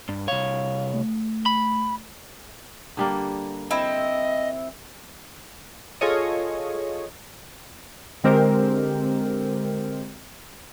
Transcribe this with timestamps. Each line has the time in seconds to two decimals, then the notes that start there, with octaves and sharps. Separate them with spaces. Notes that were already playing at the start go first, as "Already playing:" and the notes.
0.09 G2
0.28 C2 C#5 F5
0.94 A3
1.46 B5
2.97 D3 G3 A#3
3.71 C4 E4 D#5
6.01 F4 G#4 A4 C#5 D#5
8.24 D3 G#3 C4 G4 A#4 C5